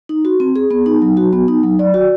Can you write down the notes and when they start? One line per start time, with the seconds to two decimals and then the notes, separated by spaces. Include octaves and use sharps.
0.09 D#4
0.25 F#4
0.40 C4
0.56 G#4
0.71 B3
0.86 D#4
1.02 F#3
1.17 F#4
1.33 B3
1.48 D#4
1.63 F#3
1.79 D5
1.94 F#4